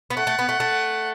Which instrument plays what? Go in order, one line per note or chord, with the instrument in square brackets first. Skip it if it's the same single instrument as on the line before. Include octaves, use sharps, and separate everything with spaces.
[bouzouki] B3
[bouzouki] A3 [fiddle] F#5
[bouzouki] A3
B3
A3
A3